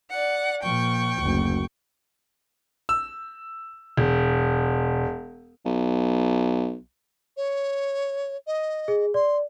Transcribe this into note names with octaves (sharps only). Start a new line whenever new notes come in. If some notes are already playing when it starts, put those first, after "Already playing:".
D5 F#5
A#2 F3 G5 C#6
F#1 D2
E6
E1
B1
C#5
D#5
G#4
D5 C6